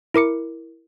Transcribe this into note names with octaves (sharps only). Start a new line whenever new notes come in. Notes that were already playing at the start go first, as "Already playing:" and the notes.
E4 A#4 D6 C#7